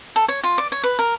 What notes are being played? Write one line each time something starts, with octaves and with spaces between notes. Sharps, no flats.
A4
C#5
F4
D5
C#5
B4
A#4